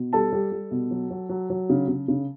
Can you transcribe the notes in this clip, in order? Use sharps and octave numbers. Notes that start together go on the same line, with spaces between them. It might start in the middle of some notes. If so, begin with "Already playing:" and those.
Already playing: B2
G3 A4 A5
G3
G3
B2
F#3
F#3
F#3
F#3
C#3
C#3
C#3